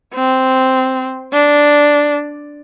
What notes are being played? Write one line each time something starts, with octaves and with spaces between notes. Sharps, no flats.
C4
D4